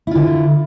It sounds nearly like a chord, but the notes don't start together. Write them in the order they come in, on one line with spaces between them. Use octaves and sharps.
E4 F4 D3